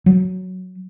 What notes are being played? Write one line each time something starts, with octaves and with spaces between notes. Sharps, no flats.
F#3